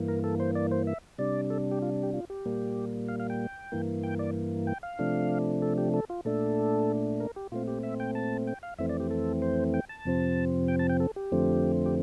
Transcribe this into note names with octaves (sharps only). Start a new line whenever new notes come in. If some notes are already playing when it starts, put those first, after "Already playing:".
Already playing: G2 E3 A#3
A#4
A4
C5
D5
C5
E5
C3 G3 D4 D5
A4
G4
F4
G4
F4
G4
A#2 G3 A#3
F5
F5
G5
G2 E3 A#3
G5
D5
G5
F5
C3 F3 A3 D4
A4
G4
A4
F4
A#2 A3 D4 A4
A#4
G4
A#2 A3 C4 F4
G4
E5
G5
A5
G5
F5
F2 E3 A3 C4 E5
D5
G4
A4
C5
G5
A5
F2 C3 F3 C4
G5
A5
G5
A4
G4
F2 D3 F3 A3 C4
G4